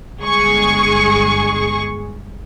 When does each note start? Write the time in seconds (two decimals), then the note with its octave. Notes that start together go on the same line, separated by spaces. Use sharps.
0.20 G1 G#3 G#4 C#6